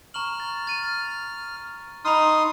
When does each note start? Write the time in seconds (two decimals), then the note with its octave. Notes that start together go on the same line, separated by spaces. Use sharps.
0.14 A#5 C#6 F6 F#7
0.35 A6 F#7
0.67 A6 D#7
2.05 D#4 B5 C6 D#6 F6